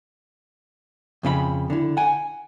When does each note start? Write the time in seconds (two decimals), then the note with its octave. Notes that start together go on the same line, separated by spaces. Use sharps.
1.23 F2 C#3 F4 B5
1.70 D3 E4
1.97 F#5 G#5